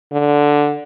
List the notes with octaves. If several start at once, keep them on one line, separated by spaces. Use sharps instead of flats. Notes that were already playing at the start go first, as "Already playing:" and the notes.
D3